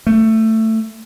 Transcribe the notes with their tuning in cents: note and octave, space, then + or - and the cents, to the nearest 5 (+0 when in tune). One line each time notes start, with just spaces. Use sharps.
A3 +15